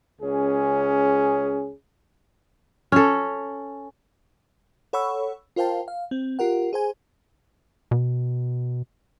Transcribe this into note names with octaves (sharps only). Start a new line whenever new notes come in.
C#2 C#4 G#4
C#4 A4
A4 C#5 F#5 B5 C#6 E6
F4 A#4 C5 F5 G5 A5
F5
C4
F4 G4 A#4 F#5
G#4 C5 G#5
B2